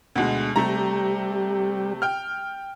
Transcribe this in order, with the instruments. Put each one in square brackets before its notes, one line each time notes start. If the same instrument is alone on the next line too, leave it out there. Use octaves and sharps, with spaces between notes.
[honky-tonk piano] D2 B2 G#3
[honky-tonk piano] C3 A3 A#5 [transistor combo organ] G3
[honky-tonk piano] G5 F6